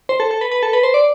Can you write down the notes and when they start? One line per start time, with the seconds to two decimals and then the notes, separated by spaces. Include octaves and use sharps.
0.09 C5
0.20 A4
0.31 A4
0.41 B4
0.51 B4
0.63 A4
0.73 B4
0.83 C5
0.94 D5